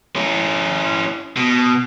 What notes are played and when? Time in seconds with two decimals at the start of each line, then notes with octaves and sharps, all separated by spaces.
0.16 C#4 E4
1.37 B2